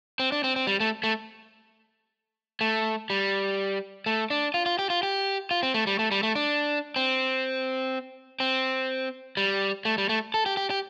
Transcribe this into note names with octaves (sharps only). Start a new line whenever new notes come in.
C4
D4
C4
C4
G3
A3
A3
A3
G3
A3
D4
F4
F4
G4
F4
G4
F4
C4
A3
G3
A3
G3
A3
D4
C4
C4
G3
A3
G3
A3
A4
G4
G4
G4